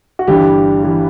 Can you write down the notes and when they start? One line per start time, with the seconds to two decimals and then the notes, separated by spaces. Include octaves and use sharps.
0.19 F#4
0.28 G1 G2 E3 G3 G4
0.84 E3 G3